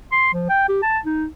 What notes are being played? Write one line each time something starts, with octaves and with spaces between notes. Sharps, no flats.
C6
F3
G5
G4
A5
D#4